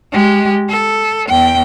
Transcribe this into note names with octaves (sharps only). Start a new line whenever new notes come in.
G#3 G4
A4
E2 G5